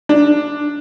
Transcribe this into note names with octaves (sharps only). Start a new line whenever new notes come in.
D4